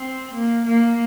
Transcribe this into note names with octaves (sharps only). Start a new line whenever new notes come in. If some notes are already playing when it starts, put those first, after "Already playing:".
Already playing: C4
A#3
A#3